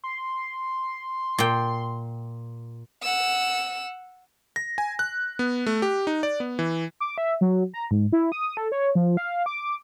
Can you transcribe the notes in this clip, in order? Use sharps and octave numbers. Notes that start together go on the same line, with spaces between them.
C6
A#2 G5
F#5 E6
A#6
G#5
F#6
B3
A3
G4
D#4
D5
B3
E3
D6
E5
F#3
A#5
G#2
E4
D#6
A4
C#5
F3
F5
D6